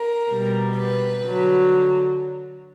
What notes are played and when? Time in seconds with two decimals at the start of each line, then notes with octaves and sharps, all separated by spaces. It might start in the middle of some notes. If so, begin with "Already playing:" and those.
Already playing: A#4
0.31 B2 G3
0.77 B4
1.21 D3 F#3